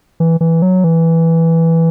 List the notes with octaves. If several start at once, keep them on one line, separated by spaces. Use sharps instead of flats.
E3
E3
F#3
E3